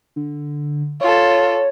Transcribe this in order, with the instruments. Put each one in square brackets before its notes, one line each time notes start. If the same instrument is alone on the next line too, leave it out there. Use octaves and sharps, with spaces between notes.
[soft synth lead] D3
[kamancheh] F4 A4 [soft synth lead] C#5